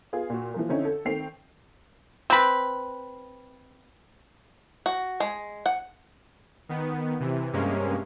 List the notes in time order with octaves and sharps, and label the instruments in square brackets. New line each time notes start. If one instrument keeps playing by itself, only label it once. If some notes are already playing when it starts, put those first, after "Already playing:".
[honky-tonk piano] B3 F4 G#4
A#2 F#4
E3 F3 A#3
D3 C4 C#4 D#4 E4
A4
D#3 A3 C4 G5 C7 F7
[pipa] C4 B4
[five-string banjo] F#4
G#3
F#5
[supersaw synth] D#3 B3
C3 E3
G2 C3 G#3 A#3 C#4